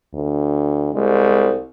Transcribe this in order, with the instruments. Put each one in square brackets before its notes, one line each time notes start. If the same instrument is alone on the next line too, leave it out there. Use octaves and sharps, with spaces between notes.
[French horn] D2
[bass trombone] C2 [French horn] G#3